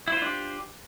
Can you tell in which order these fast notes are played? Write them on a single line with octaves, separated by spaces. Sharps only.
E4 C5 F4 D4 G4